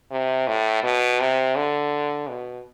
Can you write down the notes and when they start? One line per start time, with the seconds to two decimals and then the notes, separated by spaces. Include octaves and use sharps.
0.11 C3
0.48 A2
0.83 B2
1.20 C3
1.56 D3
2.29 B2